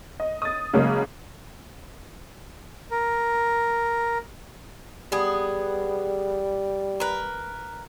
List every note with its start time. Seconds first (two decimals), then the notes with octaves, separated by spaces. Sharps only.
0.20 D#5
0.42 D#6 A6
0.73 C#3 F#3 G#3 A#3
2.91 A#4
5.12 G3 B3 G#4
7.00 A#4 B4